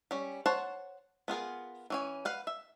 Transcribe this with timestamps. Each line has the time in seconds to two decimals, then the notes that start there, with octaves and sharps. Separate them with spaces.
0.11 G3 C#4
0.46 C5 C#5 F#5 A5
1.28 B3 F4 G#4 A#4
1.90 E3 C#4 G#5
2.25 B4 F5 F#5
2.47 E5